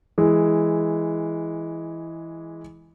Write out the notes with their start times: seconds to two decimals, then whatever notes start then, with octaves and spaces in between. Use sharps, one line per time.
0.18 E3 G#3